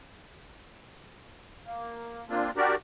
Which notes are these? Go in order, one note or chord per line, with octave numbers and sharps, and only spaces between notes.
A#3
A#3 C4 D4 F4
D4 F#4 G4 A#4 D5